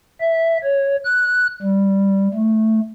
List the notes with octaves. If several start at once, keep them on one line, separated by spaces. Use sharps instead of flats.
E5
C#5
F#6
G3
A3